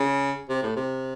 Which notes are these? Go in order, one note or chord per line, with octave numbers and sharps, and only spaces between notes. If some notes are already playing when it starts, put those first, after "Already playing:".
Already playing: C#3
C3
A2
C3